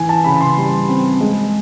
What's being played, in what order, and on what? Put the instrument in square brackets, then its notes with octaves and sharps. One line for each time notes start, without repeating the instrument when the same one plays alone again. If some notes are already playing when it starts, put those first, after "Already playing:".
Already playing: [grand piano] E3 G#5
A5
C#3 B5
C6
G3
C4
G#3